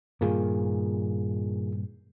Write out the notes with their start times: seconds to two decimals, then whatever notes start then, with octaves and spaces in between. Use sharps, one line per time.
0.21 G2 A#2 D#3 A#3 F4 G#4